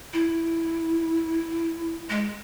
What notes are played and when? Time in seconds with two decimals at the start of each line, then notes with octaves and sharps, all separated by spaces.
0.13 E4
2.10 G#3